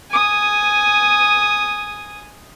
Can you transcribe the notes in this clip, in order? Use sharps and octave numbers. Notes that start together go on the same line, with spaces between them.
G#5 D#6